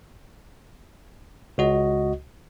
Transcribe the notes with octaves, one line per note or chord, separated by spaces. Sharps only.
C#2 F#4 D#5